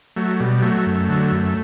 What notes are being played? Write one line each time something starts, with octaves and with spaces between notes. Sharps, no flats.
F#3 A3
B2 G3
F#3 A3
F#2
D3 F#3
F#2